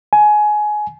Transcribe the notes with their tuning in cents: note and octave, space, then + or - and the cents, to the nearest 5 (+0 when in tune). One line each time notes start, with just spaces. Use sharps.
G#5 +20